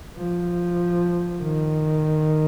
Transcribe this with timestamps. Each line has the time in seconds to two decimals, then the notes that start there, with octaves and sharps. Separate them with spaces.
0.17 F3
1.42 D#3